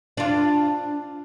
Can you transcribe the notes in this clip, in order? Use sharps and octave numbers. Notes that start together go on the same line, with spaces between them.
D4 F4